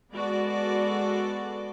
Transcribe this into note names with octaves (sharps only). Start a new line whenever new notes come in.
G#3 B3 F#4 A4 D5